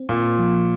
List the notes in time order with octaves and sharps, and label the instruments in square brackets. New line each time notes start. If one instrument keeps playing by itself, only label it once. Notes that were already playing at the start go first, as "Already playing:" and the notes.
Already playing: [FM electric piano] C4
[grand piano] A#2 [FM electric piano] A#3
[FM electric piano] F3